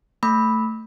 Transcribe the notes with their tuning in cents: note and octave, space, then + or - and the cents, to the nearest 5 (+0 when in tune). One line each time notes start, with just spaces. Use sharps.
A3 +15 B5 +0 E6 -25